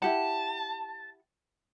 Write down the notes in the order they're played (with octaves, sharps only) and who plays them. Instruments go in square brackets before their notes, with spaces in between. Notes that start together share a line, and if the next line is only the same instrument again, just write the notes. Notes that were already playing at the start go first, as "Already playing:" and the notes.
[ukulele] E4 G4 F#5 [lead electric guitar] A5